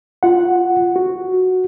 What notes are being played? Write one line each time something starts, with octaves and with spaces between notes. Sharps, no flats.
F4 F#5
F#4